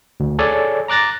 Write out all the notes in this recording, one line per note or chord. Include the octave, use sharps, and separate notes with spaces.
D2
G#4 A4 C#5 D5 G#5
A#5 D6 F#6 A6 A#6